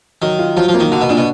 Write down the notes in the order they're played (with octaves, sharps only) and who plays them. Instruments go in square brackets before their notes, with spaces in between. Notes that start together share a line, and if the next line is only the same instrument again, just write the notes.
[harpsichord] D#3 [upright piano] F#3
[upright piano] F4
[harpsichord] F3 [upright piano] F#3
[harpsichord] F3
[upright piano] A#3
[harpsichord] D#3
[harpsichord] D3 [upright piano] F#4
[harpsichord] B2
[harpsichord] A#2 [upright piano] D4
[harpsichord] B2